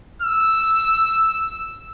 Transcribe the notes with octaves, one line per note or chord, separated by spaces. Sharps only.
E6